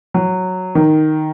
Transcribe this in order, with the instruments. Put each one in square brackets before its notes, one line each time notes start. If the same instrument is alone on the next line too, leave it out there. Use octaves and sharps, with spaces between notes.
[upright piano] F#3
D#3